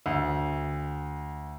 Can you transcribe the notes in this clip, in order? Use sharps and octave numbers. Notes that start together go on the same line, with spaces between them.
D2